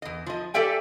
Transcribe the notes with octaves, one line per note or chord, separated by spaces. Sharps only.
E2 D#5
F3 D#5
G4 A4 D5 E5 G5 G#5